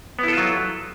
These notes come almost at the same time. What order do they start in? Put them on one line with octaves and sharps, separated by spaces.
B3 E4 A4 F4 F#3